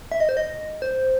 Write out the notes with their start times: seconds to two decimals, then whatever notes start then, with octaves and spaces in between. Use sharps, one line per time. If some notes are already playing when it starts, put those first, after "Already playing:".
0.12 E5
0.20 D#5
0.29 C5
0.37 D#5
0.82 C5